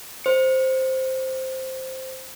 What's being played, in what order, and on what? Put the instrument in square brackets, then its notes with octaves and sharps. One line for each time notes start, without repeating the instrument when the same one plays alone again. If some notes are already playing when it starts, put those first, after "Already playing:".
[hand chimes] C5 C#7